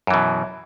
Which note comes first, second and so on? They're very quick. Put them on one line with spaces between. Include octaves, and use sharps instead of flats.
F#2 E3 B2